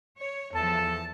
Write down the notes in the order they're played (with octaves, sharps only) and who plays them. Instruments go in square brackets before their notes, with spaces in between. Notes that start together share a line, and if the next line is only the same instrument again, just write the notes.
[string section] C#5
[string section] E2 F3 [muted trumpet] A4 [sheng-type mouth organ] A5